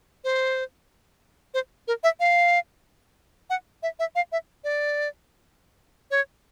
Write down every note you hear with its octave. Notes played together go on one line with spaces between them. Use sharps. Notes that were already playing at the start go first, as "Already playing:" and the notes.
C5
C5
A#4
E5
F5
F#5
E5
E5
F5
E5
D5
C#5